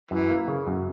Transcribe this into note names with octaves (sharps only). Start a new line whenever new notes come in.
F#2 E3
A#3
C#3
F#2